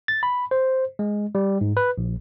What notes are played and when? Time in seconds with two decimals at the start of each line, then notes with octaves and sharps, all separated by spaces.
0.08 A6
0.23 B5
0.51 C5
0.99 G#3
1.35 G3
1.61 G#2
1.77 B4
1.98 A#1